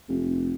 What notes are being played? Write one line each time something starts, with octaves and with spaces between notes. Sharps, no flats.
F1